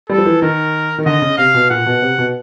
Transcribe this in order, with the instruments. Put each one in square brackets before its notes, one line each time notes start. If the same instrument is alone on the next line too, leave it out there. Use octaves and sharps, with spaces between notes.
[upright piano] G3 [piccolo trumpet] A4
[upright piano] F3
E3
[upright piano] D#3 [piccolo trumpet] A#4
[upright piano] D#3
[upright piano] D3 [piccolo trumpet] D#5
[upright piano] C#3
[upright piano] C3 [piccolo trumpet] F5
[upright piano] B2
[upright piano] A#2 [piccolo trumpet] F#5
[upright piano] B2
C3
B2